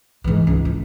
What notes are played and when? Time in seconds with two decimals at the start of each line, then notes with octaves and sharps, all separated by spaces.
0.24 G#2 E3
0.47 C#2
0.65 E4